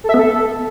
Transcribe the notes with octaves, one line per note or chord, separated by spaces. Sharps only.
A4
E5
B3
A4